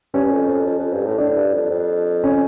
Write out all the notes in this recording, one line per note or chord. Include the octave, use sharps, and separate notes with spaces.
G2 C#4
F2
F2
F2
F2
G2
A2
A2 D4
G2
F2
F2
C#4